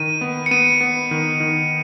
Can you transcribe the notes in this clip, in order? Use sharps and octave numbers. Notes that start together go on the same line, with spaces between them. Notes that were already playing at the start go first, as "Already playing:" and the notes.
Already playing: D#3 D#7
B3
C#7
B3 D#7
B3
D#3
D#3